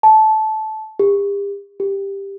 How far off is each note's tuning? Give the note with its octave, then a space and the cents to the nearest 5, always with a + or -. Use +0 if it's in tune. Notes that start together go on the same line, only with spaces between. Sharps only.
A5 -15
G4 +40
G4 +10